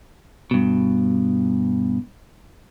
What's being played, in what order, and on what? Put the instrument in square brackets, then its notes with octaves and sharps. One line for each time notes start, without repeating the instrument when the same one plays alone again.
[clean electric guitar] G2 B2